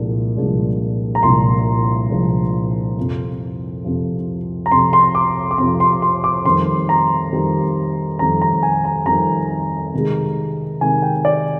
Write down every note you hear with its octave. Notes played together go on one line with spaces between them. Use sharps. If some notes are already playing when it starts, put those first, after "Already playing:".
Already playing: C2 A#2 F3 G#3 D4
C2 A#2 F3 G#3 D4
A#5
C2 A#2 F3 G#3 D4 C6
C2 A#2 F3 G#3 D4
F2 C3 F3
F2 C3 F3
A#5
F2 C3 F3 C6
C6
D6
D6
F2 C3 F3 C6
C6
C6
D6
F2 D#3 G3 C4 C6
A#5
F2 D#3 G3 C4
F2 D#3 G3 C4 A#5
A#5
G#5
A#5
F2 D#3 G3 C4 A#5
C3 D#3 G#3
C3 D#3 G#3 G#5
G5
D5